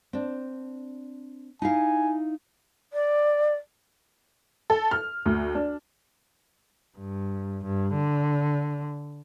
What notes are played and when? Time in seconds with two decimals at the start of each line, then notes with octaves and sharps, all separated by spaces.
0.13 C4 D4
1.62 D#4 E4 F5 G#5
2.93 D5
4.70 A4
4.91 F6
5.26 D2
5.55 D4
6.98 G2
7.64 G2
7.94 D3